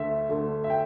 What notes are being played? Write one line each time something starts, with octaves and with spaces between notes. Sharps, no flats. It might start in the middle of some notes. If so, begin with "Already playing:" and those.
Already playing: D2 D3 A3 E5
D2 D3 A3
E5
G5